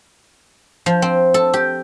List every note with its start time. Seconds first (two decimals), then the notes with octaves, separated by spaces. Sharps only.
0.86 F3
1.02 C4
1.34 A4
1.54 G4